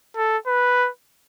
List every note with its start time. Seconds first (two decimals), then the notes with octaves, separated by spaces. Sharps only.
0.16 A4
0.47 B4